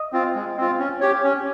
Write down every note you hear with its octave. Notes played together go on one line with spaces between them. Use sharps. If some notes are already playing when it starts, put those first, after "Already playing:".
Already playing: D#5
C4 F4
G#3
C4 F4
C#4
G4 C#5
C#4